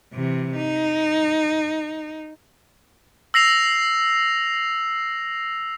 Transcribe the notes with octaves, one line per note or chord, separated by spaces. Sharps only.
C3 E3
D#4
E6 A#6 C7 F7